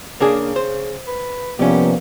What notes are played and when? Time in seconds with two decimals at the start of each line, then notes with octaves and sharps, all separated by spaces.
0.21 C#3 A#3 D4 G#4
0.56 C5
1.07 B4
1.59 C2 F3 A#3 B3 C#4 G4